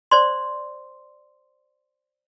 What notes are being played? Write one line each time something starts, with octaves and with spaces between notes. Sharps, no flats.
C5 D5 C6